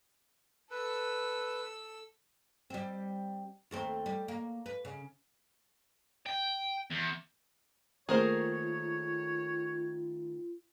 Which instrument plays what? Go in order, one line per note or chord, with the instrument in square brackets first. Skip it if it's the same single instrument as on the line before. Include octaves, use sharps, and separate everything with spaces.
[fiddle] A4 E6 [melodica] B4
[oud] G3 C4
D#2 A3 C4
G3
A#3
B4
C#3
[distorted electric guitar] G5
E2
[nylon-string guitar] D#3 A3 A#3 [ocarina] F4 [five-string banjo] G#4 A#4 C5 [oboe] C#5